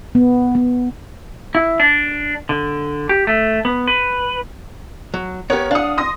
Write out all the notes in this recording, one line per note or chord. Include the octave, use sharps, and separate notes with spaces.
B3
B3
E4
D4
D3
G4
A3
B3
B4
F#3
B3 G4 A#4 C#5
D4 F5 F#5 D#6
C6 D#6 A#6